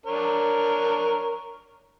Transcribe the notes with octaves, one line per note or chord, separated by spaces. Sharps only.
D4 A#4 C#5